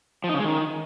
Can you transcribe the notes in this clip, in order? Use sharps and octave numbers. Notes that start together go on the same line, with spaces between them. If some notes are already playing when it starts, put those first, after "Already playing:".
F3
D#4
C#3
G#3
D#3